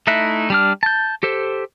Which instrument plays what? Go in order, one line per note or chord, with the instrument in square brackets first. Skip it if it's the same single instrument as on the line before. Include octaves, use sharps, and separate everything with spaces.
[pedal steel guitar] A3 D#4 E4 E5 F#6
G3 D4 F6
A5 G6
G4 A4 C5